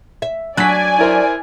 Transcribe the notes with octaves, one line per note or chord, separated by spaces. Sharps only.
E5
F#3 D4 D5 G#5 F#6 B6
E4 A#4 C5